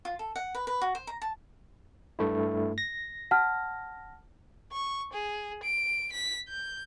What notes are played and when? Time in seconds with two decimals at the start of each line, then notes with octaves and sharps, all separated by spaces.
0.05 F4
0.19 A4
0.36 F#5
0.55 B4
0.67 B4
0.81 F#4
0.95 C5
1.07 A#5
1.22 A5
2.19 G2 A3 E4
2.78 A#6
3.31 F#5 A5 F6
4.72 C#6
5.13 G#4
5.63 D7
6.12 B6
6.49 G6